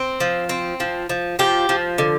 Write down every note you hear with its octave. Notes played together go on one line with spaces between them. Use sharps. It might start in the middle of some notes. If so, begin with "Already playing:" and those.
Already playing: C4
F3
C4
F3
F3
F3 G4
F3
D3